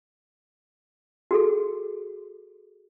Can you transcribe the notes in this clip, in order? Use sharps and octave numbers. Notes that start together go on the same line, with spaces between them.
F#4 G#4 A4